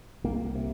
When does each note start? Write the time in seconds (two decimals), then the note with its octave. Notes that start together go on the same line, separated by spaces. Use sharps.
0.24 C2 A#3
0.55 C3